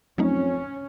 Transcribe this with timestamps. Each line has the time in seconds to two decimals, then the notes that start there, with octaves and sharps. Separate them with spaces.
0.18 F2 F#3 A3 C#4 D#4